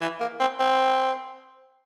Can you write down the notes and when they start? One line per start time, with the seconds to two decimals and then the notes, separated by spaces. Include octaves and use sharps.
0.02 E3
0.21 A#3
0.40 C4
0.60 C4